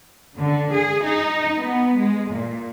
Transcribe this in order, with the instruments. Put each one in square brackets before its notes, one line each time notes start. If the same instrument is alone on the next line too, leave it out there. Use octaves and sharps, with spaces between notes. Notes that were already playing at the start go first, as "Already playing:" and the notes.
[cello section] D3
G#4
D#4
B3
G#3
A#2